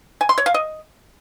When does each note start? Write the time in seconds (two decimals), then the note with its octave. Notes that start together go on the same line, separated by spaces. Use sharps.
0.21 G#5
0.29 C6
0.38 C#5
0.46 F5
0.54 D#5